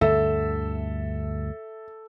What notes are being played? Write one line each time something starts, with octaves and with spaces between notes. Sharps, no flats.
D2 G2 D3 A4 E5